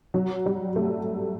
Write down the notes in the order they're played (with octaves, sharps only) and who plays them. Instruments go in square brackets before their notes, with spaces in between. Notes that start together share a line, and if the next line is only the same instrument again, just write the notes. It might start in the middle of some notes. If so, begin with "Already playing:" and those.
[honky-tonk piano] F#3
G3
A3